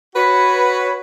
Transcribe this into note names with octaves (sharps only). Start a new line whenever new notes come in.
F#4 B4 C#5